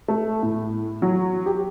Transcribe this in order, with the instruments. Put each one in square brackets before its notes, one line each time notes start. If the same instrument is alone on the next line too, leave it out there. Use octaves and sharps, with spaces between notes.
[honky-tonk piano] A3
A2
F#3
G4